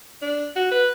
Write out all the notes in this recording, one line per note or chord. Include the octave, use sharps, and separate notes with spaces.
D4
F#4
B4